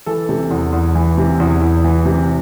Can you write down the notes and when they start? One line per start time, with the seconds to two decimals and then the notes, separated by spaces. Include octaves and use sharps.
0.06 E3 A4
0.29 C3
0.50 E2
0.72 E2
0.95 E3
1.18 C3
1.40 E2
1.62 E2
1.84 E3
2.05 C3